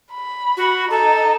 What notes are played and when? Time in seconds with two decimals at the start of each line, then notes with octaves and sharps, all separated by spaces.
0.12 B5
0.57 F#4
0.90 D#4 A4